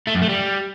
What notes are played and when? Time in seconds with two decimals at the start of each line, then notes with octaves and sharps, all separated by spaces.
0.07 A3
0.14 F#2
0.22 A3
0.29 G3